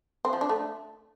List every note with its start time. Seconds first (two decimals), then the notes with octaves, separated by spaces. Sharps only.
0.25 C4
0.33 F3
0.41 D4
0.49 A3